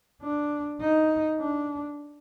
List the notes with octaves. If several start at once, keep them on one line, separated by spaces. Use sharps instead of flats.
D4
D#4
D4